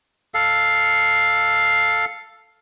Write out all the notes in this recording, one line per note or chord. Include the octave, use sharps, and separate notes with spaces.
A4 F5